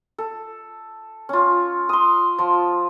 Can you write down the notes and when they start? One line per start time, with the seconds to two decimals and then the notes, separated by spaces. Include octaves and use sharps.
0.18 A4
1.29 C#4 F4
1.89 C6 D#6
2.39 F3